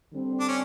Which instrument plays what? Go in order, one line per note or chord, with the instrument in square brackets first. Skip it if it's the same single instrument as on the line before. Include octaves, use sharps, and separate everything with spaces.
[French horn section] D3 G3 C4
[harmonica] D4
C#4